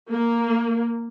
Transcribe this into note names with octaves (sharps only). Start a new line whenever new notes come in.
A#3